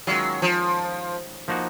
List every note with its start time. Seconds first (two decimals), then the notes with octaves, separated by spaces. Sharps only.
0.07 D#3 F#3 G#3 C#4 F4
0.42 F3
1.48 F3 A#3 D#4 F#4